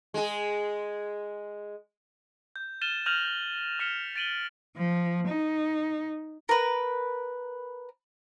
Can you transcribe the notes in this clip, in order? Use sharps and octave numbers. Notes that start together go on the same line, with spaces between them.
G#3 G#4
G6
F6 A6 D#7 E7 G7
F6 G6 A#6 D#7 F7 F#7
F6 G6
F6 B6 C#7 D#7 E7 G7
A6 D7 D#7 F#7 G7
F3
D#4
A#4 B4